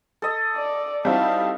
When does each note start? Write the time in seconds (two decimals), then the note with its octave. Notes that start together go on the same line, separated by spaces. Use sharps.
0.22 A4 D#5
0.56 D5
1.05 G3 C4 D#4 E4 F#4 F5 A5